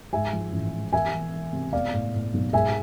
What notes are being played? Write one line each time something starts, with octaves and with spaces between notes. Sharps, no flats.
G#2 E5 G#5
F3
A1
G#3
E1 E5 G#5
E1
E1
C3
B3 D5 F5
A2
A2
B1
G#2 E5 G#5